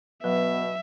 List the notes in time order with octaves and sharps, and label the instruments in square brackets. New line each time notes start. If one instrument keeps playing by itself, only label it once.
[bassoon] B2 [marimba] F#3 [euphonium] B3 [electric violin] E5